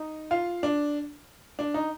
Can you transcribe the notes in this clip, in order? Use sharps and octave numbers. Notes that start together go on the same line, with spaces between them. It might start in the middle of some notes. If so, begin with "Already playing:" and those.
Already playing: D#4
F4
D4
D4
D#4